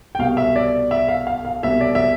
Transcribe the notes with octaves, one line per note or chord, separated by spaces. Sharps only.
G5
C2 B2 F5
E5
D5
E5
F5
F5
F5
C2 B2 E5
D5
E5